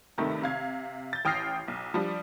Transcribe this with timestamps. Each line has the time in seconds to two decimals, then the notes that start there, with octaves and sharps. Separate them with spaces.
0.18 G2 C3 D#3 A3
0.42 C3 F5 G#6
1.13 G6 A6
1.25 A1 G5 D#6 F6 A#6 C7
1.68 B1
1.94 F3 G3 D4